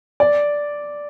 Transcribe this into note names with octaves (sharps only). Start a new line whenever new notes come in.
D5